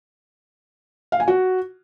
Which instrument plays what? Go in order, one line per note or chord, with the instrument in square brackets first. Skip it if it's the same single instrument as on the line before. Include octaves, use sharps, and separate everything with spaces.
[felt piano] F5
G#5
F#4